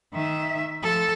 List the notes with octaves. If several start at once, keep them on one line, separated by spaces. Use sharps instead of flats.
D#3 E5
F3 A4